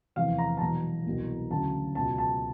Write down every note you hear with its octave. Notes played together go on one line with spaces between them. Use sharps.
F1 E2 C3 E3 F5
A#5
A5
E1 E2 B2 F#3 A#5
C2 B2 F#3
D2 C#3 F#3 A5
C#2 B2 F#3 A5
A5